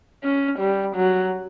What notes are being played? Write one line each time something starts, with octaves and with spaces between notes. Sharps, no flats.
C#4
G3
F#3